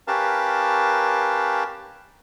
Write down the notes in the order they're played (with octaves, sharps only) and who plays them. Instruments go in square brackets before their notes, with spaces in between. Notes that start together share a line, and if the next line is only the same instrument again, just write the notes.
[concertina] C#4 G4 A#4 B4 F5 A5